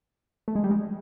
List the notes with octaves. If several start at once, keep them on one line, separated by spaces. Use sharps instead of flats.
A3
G#3
G3
G#3